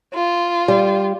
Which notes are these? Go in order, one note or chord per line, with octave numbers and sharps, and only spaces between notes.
F4
G3